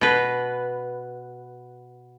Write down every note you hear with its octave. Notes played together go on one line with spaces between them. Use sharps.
B2 B4